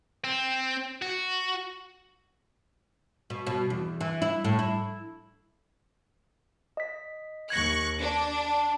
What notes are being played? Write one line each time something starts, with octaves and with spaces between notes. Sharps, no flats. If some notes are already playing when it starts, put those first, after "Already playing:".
C4
F#4
B2
B2
E2
E3
E4
A2
E4
D#5 B6
D#2 C#6 F#6 G#6 A#6
D4
A5